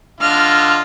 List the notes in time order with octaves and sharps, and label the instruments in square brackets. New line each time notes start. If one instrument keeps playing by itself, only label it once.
[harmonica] D3 F4 D#5 [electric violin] F6